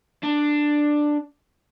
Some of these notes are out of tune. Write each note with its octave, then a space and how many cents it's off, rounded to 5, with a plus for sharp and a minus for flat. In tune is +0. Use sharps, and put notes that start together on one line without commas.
D4 +10